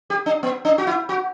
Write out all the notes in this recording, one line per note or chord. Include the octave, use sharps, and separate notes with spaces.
G4
D4
B3
D4
F#4
E4
F#4